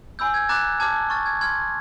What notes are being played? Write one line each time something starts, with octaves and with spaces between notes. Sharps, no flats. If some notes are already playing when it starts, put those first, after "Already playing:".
G#5 B5 E6 G6
G#6
A#5 D6 F#6 A6
A5 D6 F6 G#6
C#6 F6 A6
G#6
C6 F6 G#6